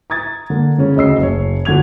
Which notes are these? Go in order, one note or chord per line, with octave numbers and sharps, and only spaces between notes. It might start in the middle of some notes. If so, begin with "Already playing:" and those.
A#5 D#6 G#6 A6
D3 A#3
C#3 C#4
D2 C#3 D#5 E6 C7
F#1 C#5
G1 D3 F#4 G#6 F7